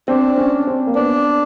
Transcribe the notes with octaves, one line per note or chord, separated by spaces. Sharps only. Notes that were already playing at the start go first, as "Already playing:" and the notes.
C4 D4
C#4
C4
A#3
B3 D4